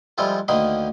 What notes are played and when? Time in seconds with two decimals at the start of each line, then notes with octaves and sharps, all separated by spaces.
0.18 F3 G3 G#3 E4 F4 A4
0.48 D2 D#3 A#3 D#5 B5 C6